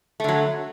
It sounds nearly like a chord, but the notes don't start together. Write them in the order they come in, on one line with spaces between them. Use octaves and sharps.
A3 D3 F#3